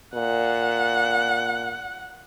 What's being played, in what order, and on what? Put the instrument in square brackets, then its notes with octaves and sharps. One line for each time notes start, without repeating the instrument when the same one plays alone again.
[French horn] A#2 [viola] F#5